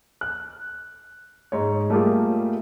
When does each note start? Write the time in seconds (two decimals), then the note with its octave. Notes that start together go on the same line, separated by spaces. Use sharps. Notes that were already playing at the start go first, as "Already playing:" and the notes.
0.21 F#6
1.52 G#2 C#5
1.90 G3 A3 A#3 F4 G4 G#4